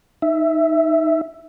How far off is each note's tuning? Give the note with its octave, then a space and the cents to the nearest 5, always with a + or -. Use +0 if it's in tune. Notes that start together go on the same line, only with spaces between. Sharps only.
D#4 +0 E5 +0